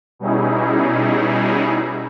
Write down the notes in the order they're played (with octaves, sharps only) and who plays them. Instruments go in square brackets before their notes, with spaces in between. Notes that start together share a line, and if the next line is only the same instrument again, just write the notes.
[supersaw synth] B2 G3 C#4 D#4 E4 G#4